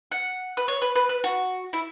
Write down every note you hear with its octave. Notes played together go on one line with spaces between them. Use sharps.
F#5
B4
C#5
B4
B4
B4
F#4
E4